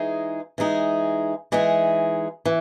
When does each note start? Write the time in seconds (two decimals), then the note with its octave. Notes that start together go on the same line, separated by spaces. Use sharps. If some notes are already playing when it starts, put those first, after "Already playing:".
Already playing: E3 G#3 D#4 G#4
0.58 E3 G#3 D#4 G#4
1.52 E3 G#3 D#4 G#4
2.45 E3